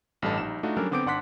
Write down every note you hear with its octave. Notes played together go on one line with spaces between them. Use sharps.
A1 G2 G3 A4 D#5 A5
A#1 G3 D#4 E7
A3 D4 D#4 F4 F#4
F#3 G3 C#4 D4 A4 A#4
D3 B3 C4 D6 G6 D7
G#1 D4 F#5 C6 F#6 B6